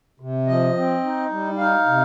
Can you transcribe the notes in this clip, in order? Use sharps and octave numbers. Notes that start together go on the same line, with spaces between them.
C3
F3 D#5
C4
D#4
G3
D#4 F5
C3